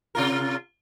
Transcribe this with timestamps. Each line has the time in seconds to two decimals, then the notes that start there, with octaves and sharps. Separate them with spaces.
0.15 C3 F4 A#4